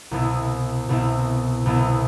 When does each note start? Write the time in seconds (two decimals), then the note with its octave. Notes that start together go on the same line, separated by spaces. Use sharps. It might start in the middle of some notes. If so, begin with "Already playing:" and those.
0.11 C2 B2 B3 E4
0.89 C2 B2 B3 E4
1.66 C2 B2 B3 E4